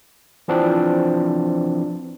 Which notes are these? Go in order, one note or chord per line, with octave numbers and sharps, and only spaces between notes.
E3 F3 C4 D4